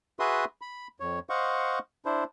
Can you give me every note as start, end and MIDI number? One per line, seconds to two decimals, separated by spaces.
0.19 0.45 66
0.19 0.45 68
0.19 0.45 71
0.19 0.45 76
0.19 0.45 84
0.19 0.45 87
0.62 0.88 83
1.00 1.19 41
1.00 1.19 73
1.29 1.79 72
1.29 1.79 75
1.29 1.79 77
1.29 1.79 78
1.29 1.79 85
2.05 2.24 62
2.05 2.24 64
2.05 2.24 72